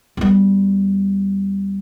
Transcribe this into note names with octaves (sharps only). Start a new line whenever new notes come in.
E2 G3